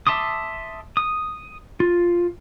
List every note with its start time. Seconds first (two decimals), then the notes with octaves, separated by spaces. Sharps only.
0.07 E5 A5 C6 D6 D#6
0.97 D#6
1.80 F4